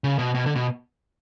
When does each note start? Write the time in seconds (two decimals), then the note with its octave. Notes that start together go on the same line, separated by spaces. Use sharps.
0.04 C#3
0.19 B2
0.35 B2
0.46 D3
0.55 B2